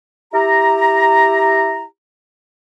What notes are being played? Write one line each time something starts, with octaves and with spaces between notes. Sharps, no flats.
E4 G4 A#5